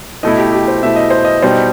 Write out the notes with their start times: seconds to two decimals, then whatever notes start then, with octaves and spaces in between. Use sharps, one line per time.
0.23 B2 A3 E4 D#5
0.38 G4
0.53 G4
0.68 C5
0.83 B2 A3 E4 E5
0.96 D#5
1.10 C5
1.25 D#5
1.42 B2 G3 D#4 C5